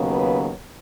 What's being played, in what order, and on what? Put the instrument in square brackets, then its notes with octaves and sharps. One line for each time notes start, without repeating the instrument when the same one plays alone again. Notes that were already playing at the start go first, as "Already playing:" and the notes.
Already playing: [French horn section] D#2 C#3 F#3 B3
B4